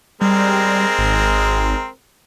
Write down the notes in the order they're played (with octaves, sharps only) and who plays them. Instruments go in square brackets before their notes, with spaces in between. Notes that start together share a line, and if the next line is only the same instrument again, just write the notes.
[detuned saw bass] G3 [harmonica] G#3 C4 A#4
[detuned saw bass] G#1